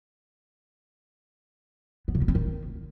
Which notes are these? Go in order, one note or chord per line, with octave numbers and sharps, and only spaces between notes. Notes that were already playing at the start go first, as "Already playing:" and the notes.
B3
C#3
B3
C4
D#3